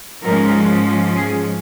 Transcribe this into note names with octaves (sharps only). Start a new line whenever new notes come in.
G#2 F3 G#3 C#4 A#4
G#4